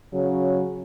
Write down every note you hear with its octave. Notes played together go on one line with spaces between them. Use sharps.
C#3 F#3